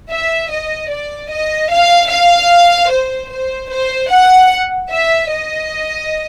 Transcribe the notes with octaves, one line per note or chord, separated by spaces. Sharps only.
E5
D#5
D5
D#5
F5
F5
C5
C5
C5
F#5
E5
D#5